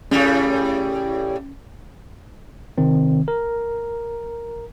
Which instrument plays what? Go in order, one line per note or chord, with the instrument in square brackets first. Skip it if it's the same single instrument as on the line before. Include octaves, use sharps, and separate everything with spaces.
[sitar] A2 C#3 G3 [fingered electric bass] C#4
[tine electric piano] C3 D#3 C4
A#4